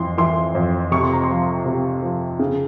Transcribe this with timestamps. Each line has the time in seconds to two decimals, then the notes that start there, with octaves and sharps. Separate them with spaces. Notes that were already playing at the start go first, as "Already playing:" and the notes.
Already playing: F2 E3 C6
0.18 E3 C6
0.55 F2
0.91 C3 C#6
1.02 C6
1.13 A#5
1.23 C6
1.29 F3
1.66 C3
2.03 F3
2.39 C#3